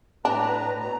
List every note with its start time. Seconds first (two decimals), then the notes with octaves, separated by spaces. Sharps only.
0.25 A2 D4 B4 A#5
0.80 B2 A#5